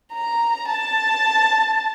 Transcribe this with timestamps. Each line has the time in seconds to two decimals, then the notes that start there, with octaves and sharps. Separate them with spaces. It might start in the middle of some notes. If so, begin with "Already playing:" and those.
0.13 A#5
0.69 A5